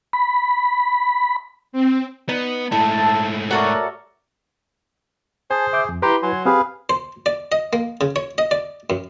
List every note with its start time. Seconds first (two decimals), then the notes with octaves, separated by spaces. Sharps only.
0.13 B5
1.73 C4
2.29 B3 D#4
2.72 G#2 A3 E4 A5
3.51 F#4 A4 A#4 C#5 D5 E5
5.51 G#4 C5 G#5 A5
5.73 E5 D6 G6
5.89 F2
6.02 E4 G4 B4 A#5 C6
6.23 F#3 G#5 C6
6.45 C4 G4 G#4 B4 F5
6.89 C5
7.26 D5
7.52 D#5
7.73 A#3
8.01 C#3
8.16 C#5
8.38 D#5
8.51 D5
8.90 F#2